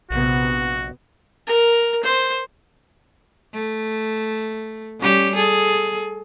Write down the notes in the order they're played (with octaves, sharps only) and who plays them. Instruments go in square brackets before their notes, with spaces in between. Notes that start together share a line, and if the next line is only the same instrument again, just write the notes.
[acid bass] A#1 [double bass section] C3 B3 [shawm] F#4
[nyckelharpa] A#4
C5
[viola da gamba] A3
G3 C#4 G4
G#4 A4